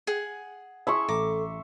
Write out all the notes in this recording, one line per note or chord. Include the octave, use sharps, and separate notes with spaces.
G#4 F#5
E4 G#4 E5 C6 C#6
A1 A4 A#5 D6